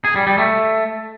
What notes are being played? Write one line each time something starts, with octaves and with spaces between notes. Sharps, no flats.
G#4
G3
G3
A3